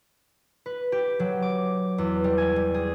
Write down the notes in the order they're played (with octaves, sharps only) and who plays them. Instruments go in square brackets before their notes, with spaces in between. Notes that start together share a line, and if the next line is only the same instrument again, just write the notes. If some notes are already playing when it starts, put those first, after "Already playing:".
[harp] B4
G4
F#3
D6
E2
G3
G#5
G3
G#4